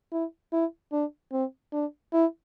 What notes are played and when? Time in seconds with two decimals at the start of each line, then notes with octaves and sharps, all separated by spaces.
0.12 E4
0.53 E4
0.92 D4
1.32 C4
1.73 D4
2.13 E4